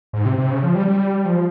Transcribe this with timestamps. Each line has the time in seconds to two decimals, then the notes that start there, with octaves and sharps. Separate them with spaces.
0.13 G#2
0.25 C3
0.38 C3
0.51 C#3
0.63 F3
0.75 G3
0.87 G3
1.25 F3